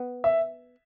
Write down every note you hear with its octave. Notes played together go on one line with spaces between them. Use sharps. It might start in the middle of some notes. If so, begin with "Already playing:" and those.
Already playing: B3
E5